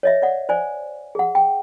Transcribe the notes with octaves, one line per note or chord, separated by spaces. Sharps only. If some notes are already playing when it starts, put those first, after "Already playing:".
C#5 D#5 E5
D5 F#5
C5 D5 G#5
G#4 F#5
G5